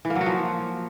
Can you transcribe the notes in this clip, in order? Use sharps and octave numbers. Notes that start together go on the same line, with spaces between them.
E3
A#3
F#3
F#4
F3